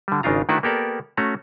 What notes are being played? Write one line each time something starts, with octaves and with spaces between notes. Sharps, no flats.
D3 G3
G#1 C#3 D4 D#4 F4 A#5
D#3 A3 D4 E4 F#4 B4
A#3 B3 G4 A4 A#4 D5
A3 C#4 F#4 A#5